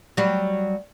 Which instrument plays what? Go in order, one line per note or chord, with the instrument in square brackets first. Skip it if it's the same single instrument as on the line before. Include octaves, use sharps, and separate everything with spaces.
[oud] F#3 G3